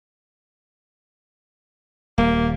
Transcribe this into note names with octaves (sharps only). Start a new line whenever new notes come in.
D#1 G3 A#3